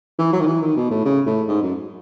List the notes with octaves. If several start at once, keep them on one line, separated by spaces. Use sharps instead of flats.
E3
F#3
D#3
E3
D#3
B2
A2
C#3
A2
G#2
F#2